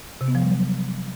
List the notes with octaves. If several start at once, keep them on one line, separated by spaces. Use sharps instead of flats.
C3
B3
F3
G3
F#3